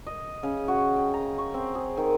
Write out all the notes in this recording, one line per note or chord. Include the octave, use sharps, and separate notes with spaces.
D#5
C#3
F#4
G5
A#5
C#6
C4
G#4
D#3